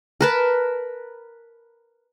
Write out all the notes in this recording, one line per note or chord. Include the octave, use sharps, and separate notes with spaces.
A#4 B4 A5